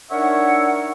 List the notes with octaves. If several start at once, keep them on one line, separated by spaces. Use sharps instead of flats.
D4 D#4 A#4 C#5 E5 F#5